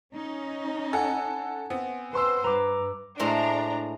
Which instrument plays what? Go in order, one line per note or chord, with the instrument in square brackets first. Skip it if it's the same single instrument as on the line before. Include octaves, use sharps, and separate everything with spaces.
[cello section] C#4 D#4
[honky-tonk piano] A4 F#5 [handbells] G#5
[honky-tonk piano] B3 C4
[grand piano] B4 C6 E6 [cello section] C5
[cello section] G2 [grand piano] B4 [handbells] A#5 D6
[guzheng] A2 G#3 C5 [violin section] D4 A#5